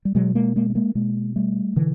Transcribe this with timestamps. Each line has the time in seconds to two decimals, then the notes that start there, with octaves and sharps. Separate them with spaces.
0.05 G3
0.15 B2 F#3 G#3
0.35 G#3 A#3
0.56 G#3 A#3
0.70 A3
0.75 G#3 A#3
0.95 B2 G#3 A#3
1.36 G3 A3
1.76 B2 D3 E3